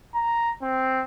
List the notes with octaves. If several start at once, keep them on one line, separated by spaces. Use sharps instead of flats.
A#5
C4